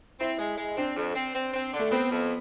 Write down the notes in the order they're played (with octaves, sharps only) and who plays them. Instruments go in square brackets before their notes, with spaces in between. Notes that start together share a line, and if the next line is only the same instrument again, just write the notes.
[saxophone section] C4 [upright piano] E4
[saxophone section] G#3
G#3
[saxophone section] C4 [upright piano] D4
[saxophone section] F2
C4
C4
C4
D3
[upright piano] A3
[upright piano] B3 [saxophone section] C4
[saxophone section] F2